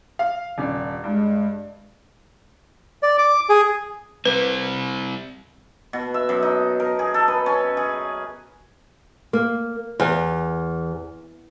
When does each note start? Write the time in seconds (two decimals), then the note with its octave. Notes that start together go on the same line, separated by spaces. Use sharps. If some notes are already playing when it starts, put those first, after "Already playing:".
0.19 F5
0.58 D#1 C#4 D4
1.04 G2 G#3
3.03 D5
3.18 D6
3.49 G#4
4.25 G3 C4 B4
5.93 B2
6.14 E5
6.29 F#2
6.43 D#4
6.80 A#4
6.99 G#4
7.14 A4
7.28 B4
7.46 C#4
7.77 G#4
9.33 A#3
10.00 E2